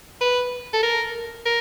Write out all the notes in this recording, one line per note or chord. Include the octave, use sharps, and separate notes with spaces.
B4
A4
A#4
A#4